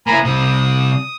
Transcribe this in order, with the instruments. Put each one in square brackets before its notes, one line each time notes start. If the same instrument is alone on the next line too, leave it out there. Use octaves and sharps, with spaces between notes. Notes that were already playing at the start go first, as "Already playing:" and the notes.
[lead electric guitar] A#3 E4 [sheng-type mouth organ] G#5 A#5 B5
[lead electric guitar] C3 G3 [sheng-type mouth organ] D#6